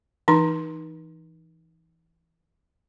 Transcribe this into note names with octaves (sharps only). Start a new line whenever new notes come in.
E3 D#4 C6